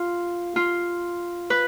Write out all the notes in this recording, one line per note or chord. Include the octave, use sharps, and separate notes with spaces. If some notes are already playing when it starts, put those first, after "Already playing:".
Already playing: F4
F4
B4